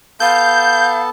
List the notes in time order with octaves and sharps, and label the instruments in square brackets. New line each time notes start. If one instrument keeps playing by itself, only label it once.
[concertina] B3 A4 A5 [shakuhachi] F5 [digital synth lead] G6